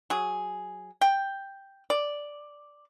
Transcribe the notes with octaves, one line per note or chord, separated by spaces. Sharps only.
F#3 G#4
G5
D5